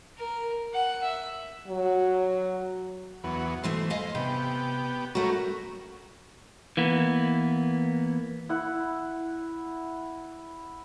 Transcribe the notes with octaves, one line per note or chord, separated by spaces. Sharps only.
A#4
F#5
E5
F#3
E2 F#3 B3
B2 E3 A3 C5
D#5 F5 G#5
C3 B3 G4
A3 C#4 F#4 A#4
E3 A#3 B3
E4 F#5